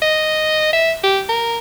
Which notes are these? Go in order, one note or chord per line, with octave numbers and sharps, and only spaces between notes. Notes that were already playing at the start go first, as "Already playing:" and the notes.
D#5
E5
G4
A#4